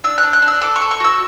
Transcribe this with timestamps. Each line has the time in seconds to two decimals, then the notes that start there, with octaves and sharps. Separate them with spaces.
0.04 D4 E6
0.18 F#6
0.23 D4
0.33 F#6
0.42 D4
0.48 E6
0.61 A4 D6
0.76 C#6
0.82 A4
0.91 C#6
1.00 F#4 E6